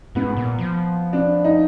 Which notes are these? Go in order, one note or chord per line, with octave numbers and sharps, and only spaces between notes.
G#2 B3
A#2
F3
D4
D#4